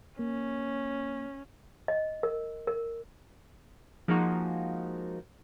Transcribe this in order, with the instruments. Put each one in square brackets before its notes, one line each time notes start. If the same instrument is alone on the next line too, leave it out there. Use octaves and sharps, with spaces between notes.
[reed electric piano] A#3 [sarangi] C#4
[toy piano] D#5
A#4
A#4
[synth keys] F3 G#3 A#3 D#4 F#4